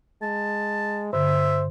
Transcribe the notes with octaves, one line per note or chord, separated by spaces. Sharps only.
G#3 A5
G2 D3 C5 E5